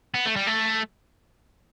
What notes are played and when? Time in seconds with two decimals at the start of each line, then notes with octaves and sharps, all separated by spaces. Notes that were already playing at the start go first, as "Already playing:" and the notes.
0.14 B3
0.26 A3
0.36 G3
0.47 A3